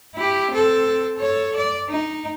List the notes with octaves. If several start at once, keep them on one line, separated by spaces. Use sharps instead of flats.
E4 G4
C4 A4
A4 C#5
D5
D#4